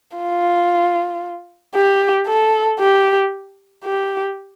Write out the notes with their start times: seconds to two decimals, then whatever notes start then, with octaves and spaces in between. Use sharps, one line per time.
0.17 F4
1.75 G4
2.27 A4
2.80 G4
3.84 G4